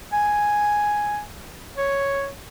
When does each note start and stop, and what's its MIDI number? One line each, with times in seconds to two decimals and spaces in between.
0.13 1.21 80
1.77 2.29 73